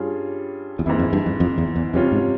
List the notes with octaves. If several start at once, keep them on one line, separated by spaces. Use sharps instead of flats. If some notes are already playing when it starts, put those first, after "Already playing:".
Already playing: G2 G3 C#4 F4 G#4
E2
F2 G#2 E3 A#3 E4
F2
G2
F2
F2
E2
E2
F2 C3 G3 C#4 F4
G#2